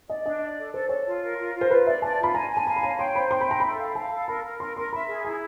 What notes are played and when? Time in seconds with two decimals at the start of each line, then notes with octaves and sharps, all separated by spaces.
0.09 D5 D#5
0.25 D4 D#5
0.41 D5
0.58 A4
0.74 A4 C5
0.89 A4 C#5
1.06 F4
1.22 A#4
1.38 F4
1.55 F4
1.61 C5
1.70 F4 B4
1.86 D5 E5
2.02 D5 A5
2.19 F4 B5
2.35 G#5 A#5
2.51 G#5
2.57 A5
2.67 F5 A#5
2.76 B5
2.83 C#5 A#5
2.99 G5 C6
3.15 C5 B5
3.31 G5 C6
3.41 B5
3.47 E5 A#5
3.60 A4 B5
3.79 F5
3.95 F5 A5
4.12 A4
4.28 A#4 B5
4.44 A#4
4.60 A#4 C6
4.76 A#4 C6
4.93 E5 B5
5.08 G#4
5.25 E4 A#5